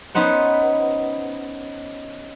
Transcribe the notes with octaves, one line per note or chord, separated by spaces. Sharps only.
B3 C#4 D#4 C5 F#5